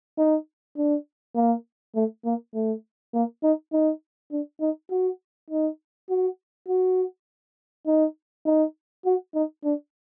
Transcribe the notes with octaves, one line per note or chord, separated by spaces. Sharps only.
D#4
D4
A#3
A3
A#3
A3
A#3
D#4
D#4
D4
D#4
F#4
D#4
F#4
F#4
D#4
D#4
F#4
D#4
D4